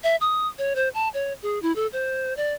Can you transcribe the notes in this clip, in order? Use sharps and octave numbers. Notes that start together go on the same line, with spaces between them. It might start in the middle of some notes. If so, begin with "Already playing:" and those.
E5
D#6
C#5
C5
A5
C#5
G#4
E4
A4
C5
D5